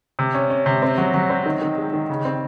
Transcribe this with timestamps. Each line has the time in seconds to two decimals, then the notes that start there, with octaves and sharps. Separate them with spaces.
0.19 C3
0.34 C#4
0.50 C#4
0.66 C3
0.82 C4
0.98 F#3
1.14 F#3
1.30 C4
1.46 D#3
1.62 D#3
1.78 G#3
1.93 D#3
2.09 C#3
2.25 C4